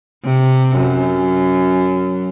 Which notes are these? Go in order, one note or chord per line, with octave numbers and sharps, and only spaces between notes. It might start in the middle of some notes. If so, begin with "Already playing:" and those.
C3
F#2